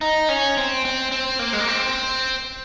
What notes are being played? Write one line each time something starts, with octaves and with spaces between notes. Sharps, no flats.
D#4
C#4
C4
C4
C4
A#3
G#3
A#3
C4